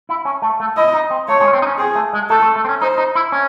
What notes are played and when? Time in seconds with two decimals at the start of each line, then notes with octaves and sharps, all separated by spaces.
0.09 E4
0.25 C#4
0.42 A3
0.60 A3
0.77 E4 D#5
0.94 D#4
1.11 C4
1.28 A3 C#5
1.41 G#3
1.48 C#4
1.53 C4
1.62 D#4
1.67 C#4
1.79 C4 G#4
1.95 A3
2.13 G#3
2.30 A3 A4
2.42 A3
2.56 A3
2.65 C4
2.69 C#4
2.82 D#4 C5
2.98 D#4
3.15 E4
3.32 C#4